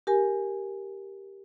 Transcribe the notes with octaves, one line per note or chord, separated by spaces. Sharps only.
G4 A#4 G#5